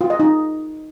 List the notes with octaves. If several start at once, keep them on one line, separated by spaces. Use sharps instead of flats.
F4
D#5
D#4